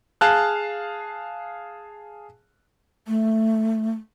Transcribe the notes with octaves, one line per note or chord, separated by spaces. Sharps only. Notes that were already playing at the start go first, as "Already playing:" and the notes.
G#4 F5 A5 F6 F#6
A3